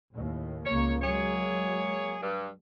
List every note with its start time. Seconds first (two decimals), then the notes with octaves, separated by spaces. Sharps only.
0.13 D#2 A2
0.66 C#2 A#3 C#5
1.02 F#3 G#3 A#3 G#4 C#5
2.23 G2